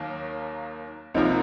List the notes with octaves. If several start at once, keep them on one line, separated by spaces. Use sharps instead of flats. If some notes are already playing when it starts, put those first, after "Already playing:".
Already playing: D#2 D#3 F#3 A#3
C2 C3 F3 A#3 D#4 F4